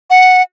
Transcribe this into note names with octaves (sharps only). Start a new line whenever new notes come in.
F#5